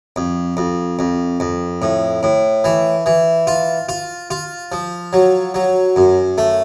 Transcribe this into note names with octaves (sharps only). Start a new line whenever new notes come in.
F2
F2
F2
F2
A2
A2
E3
E3
F4
F4
F4
F3
F#3
F#3
F#2
A3